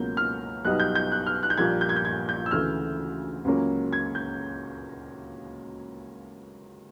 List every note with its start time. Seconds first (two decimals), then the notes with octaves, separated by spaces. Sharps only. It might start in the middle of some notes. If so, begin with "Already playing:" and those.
Already playing: C#2 B2 F#3 A#3 G6
0.17 F6
0.65 B1 B2 G3 B3 D#4 F#6
0.80 G6
0.95 G6
1.12 F#6
1.26 F6
1.43 F#6
1.50 G6
1.57 A#1 A#2 G3 A#3 G#6
1.81 G6
1.89 G#6
1.96 G6
2.05 G#6
2.29 G6
2.46 E6
2.51 D2 C#3 E3 A3 F6
3.45 C#2 C#3 F#3 A#3 C#4
3.93 G#6
4.15 G6